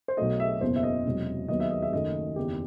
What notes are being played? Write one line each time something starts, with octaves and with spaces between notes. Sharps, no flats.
C5
B1 B2 F#3 A3 D#5
E5
F#1 E2 B2 C5
E5
D#5
E1 E2 C3 F#3
D#2 D#3 F#3 B3 D#5
E5
D#5
E5
F#1 F#2 D#3 A3 D#5
F#1 E2 D#3 G4